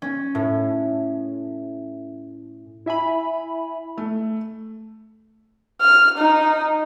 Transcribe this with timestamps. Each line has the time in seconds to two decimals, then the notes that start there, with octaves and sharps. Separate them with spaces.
0.02 C#4
0.35 A2
2.86 E4 E5 G#5 B5
3.98 A3
5.81 F6
6.18 D#4